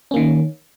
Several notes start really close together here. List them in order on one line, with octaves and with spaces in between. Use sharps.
C#4 A#3 D#3